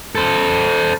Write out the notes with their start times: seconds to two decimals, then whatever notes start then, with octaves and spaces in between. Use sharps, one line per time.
0.15 A4 C5